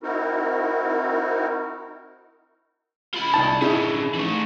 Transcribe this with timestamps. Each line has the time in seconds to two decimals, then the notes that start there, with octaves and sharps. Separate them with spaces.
0.03 C4 D#4 E4 F#4 A#4
3.14 F4 B5
3.34 C2 D#4 A5
3.62 D3 C#4 D#4 E4 G#4
4.14 E3 A3